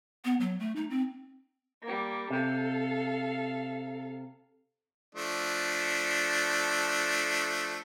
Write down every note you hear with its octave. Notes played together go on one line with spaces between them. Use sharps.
B3
F#3
A3
D#4
C4
G3 A#3
C3 A4 F5
F3 A3 D4